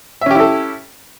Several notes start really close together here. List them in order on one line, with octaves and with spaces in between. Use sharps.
E5 C#4 G4 E4 A4